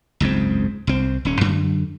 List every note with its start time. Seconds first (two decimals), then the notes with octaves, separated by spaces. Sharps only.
0.20 F#1 C#2 G#2 C4
0.87 C2 C4
1.25 D#1 C#4
1.41 F#2 D3